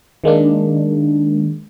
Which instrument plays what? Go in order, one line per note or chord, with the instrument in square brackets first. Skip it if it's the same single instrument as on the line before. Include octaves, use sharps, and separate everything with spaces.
[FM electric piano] D#3 G#3 A#3 D4